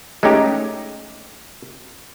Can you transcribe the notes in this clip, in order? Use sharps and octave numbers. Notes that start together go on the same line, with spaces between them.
G#3 A3 C#4 D#4 G4